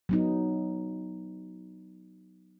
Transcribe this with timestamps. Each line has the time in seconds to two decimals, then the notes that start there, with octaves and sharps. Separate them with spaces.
0.09 F#3 B3 D#4